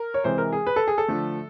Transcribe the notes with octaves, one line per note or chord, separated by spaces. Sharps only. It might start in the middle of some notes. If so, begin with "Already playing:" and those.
Already playing: A#4
C#5
C3 E3 G#3 C5
A#4
G#4
B4
A4
G#4
A4
D3 F3 A3